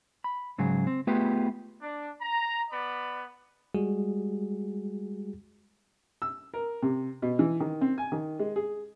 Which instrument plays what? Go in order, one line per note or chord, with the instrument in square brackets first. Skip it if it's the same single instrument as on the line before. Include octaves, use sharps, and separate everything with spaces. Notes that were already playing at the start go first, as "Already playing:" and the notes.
[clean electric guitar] B5
G#2 C#3 F#3 G#4
C4
A3 B3 F4 G4 G#4 B4
[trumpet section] D4
A#5
B3 D5 B5
[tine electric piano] G3 G#3 F#4 G#4
[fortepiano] E6
A#4
C3
B2
E3
D#3
C4
G#5
D#3
G#3
G#4